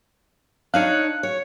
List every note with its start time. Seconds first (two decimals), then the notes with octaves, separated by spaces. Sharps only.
0.74 D4 D#4 C#5 F5 F#6
1.23 C#5